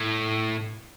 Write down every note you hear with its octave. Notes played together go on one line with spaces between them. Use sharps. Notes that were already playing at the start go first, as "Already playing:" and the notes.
Already playing: A2